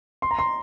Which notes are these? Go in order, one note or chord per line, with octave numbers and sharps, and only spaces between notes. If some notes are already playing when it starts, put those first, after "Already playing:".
C6
A#5
C6